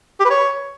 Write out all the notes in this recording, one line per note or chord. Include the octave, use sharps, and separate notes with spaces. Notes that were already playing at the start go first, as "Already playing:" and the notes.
G4
B4
C#5